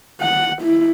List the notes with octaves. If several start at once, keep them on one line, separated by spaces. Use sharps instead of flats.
F#5
E4